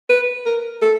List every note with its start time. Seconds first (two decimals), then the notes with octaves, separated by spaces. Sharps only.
0.09 B4
0.46 A#4
0.82 A4